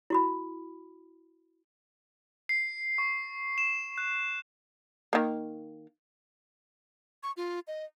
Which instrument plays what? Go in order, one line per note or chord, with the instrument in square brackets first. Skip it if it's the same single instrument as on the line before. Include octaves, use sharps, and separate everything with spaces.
[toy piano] E4 F#4 B5
[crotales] C7
C#6
E7
F#6
[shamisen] D#3 A#3
[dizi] C#6
F4
D#5